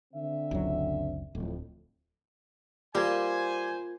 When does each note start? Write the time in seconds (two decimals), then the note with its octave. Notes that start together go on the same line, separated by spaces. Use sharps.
0.13 D3 C4 E5
0.51 F#1 C#2 F#3
1.35 D1 F2 A2
2.95 G3 A#3 F4 C5 G#5 G#6